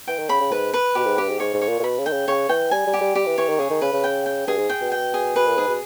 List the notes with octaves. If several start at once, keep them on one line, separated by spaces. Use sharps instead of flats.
E3 G5
D#3
C#3 B5
C#3
G#2 B4
B4
B2 G4
G#2
G2 G4
G#2
G#2 C#5
G#2
C#5
A#2
A#2
B2 B5
C#3
D#3 G5
C#3
C#3 C#5
E3 G5
G3 G#5
G3
G4
G3
G3 G4
E3
E3 C#5
D#3
C#3 G#4
D#3
C#3 B4
C#3
G5
G5
G2 G#4
G#2
G5
B2
G5
G#4
B2 B4
A#2
G#2 G#4
B2